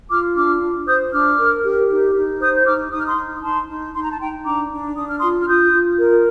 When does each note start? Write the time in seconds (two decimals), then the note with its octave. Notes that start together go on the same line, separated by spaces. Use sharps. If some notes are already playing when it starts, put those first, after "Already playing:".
0.10 F4 D6 F6
0.36 D4 D6 F6
0.62 D4
0.87 C5 D#6 G6
1.13 D4 D6 F6
1.38 A#4
1.64 G4
1.89 D#4
2.15 D#4
2.40 C5 D#6 G6
2.55 G6
2.66 D#4 D6 F6
2.92 D#4 D#6
2.99 F6
3.06 C6 D#6
3.17 D#4
3.42 D#4 A5 C6
3.68 D#4
3.94 D#4 C6
4.03 A#5
4.12 A5
4.20 D#4 G5 A#5
4.45 D4 A#5 D6
4.71 D4
4.96 D4 D#6
5.07 F6
5.19 F4 C6 D#6
5.41 F6
5.47 F4 D#6 G6
5.73 F4
5.98 A#4